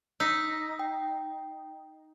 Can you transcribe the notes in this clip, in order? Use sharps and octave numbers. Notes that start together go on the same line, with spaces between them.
D#4 E6 B6
G5